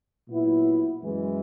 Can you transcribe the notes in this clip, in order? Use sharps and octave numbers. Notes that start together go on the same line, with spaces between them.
A#2 F#3 B3 E4
F#2 E3 G#3